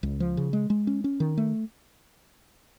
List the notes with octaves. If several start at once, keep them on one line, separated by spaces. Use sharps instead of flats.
C#2
F3
C#3
G#3
G#3
C#4
C#4
D#3
A3